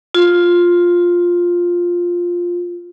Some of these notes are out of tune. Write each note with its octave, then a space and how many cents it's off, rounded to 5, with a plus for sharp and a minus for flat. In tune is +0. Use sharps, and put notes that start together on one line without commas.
F4 +5